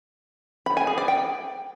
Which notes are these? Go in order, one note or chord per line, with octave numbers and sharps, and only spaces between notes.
B5
G#5
G#4
D5
G5